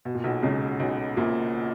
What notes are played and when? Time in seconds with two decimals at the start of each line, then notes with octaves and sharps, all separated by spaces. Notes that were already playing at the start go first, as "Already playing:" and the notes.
0.05 B2
0.15 A#2
0.24 B1 B2
0.42 C#2 C#3
0.79 B1 B2
1.17 A#1 A#2